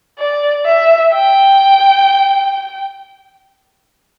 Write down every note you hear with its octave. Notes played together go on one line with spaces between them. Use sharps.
D5
E5
G5